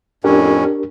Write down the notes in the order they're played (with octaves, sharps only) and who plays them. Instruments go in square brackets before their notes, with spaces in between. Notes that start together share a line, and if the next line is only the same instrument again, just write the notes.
[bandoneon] F2 A2 C#4 [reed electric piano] D4 G4 A#4